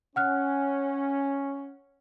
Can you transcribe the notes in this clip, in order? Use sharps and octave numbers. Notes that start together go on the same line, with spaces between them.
C#4 F#5 F6 F#6